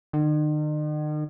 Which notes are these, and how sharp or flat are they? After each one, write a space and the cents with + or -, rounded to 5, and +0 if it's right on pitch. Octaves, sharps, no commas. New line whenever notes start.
D#3 -45